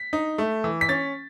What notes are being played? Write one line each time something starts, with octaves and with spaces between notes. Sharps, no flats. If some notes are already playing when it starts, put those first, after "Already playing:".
Already playing: B6
D#4
A3
E3
B6
C#4 A6